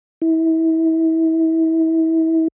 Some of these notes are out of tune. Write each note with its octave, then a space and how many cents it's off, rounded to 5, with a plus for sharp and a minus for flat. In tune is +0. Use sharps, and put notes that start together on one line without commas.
E4 -30